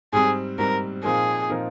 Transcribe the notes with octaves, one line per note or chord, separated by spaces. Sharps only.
G#2 G3 C4 G#4
G#2 G3 C4 A#4
A#2 F3 C4 D#4 G#4 A#4
A#2 F3 C4 D#4 A#4